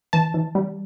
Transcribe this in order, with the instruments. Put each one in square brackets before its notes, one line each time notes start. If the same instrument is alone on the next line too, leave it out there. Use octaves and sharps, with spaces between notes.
[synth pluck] E3 A5
E3
G3